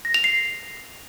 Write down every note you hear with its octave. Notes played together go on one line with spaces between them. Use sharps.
A#6
F7
C7